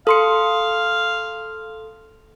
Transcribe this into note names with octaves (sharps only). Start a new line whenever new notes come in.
A4 F5 C6 C#7